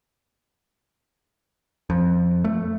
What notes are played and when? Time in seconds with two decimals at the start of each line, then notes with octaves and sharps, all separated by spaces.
1.90 F2
2.44 A3